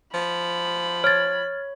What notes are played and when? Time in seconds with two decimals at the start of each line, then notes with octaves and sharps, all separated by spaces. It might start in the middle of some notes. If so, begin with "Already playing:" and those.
0.14 F3 B5
1.04 C#5 F6 A6